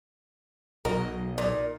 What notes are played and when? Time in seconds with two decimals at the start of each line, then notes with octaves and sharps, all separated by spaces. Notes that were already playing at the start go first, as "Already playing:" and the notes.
0.85 B1 F#4 A#4 D#5
1.38 A#2 D#4